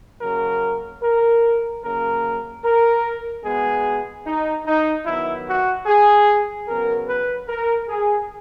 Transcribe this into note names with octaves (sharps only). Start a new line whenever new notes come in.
C#3 F#3 A#3 A#4
A#4
C#3 F#3 A#3 A#4
A#4
B2 G#3 B3 G#4
D#4
D#4
D#3 F#3 B3 E4
F#4
G#4
C#3 F#3 B3 A#4
B4
A#4
G#4